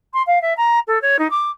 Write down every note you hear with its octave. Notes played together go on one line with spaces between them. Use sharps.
C6
F5
E5
A#5
A4
C#5
D#4
D6